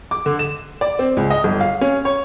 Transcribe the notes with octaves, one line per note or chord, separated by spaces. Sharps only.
D6
D3
E7
D5
C4
C#2
D#5
G1
F5
C#4
C#5